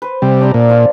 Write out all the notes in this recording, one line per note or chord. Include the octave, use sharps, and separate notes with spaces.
B4 C5
C3 G3
D4 D5 A#5
A#2
F3 F4 F5